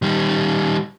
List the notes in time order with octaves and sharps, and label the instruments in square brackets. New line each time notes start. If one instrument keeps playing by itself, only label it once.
[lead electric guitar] D#3 G3